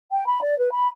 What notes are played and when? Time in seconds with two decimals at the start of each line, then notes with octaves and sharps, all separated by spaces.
0.10 G5
0.25 B5
0.41 D5
0.57 B4
0.72 B5